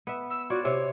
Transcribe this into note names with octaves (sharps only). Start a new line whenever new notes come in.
B3 E5
E6
F4 F#4 C#5 D5
C3 C4 E4 C#5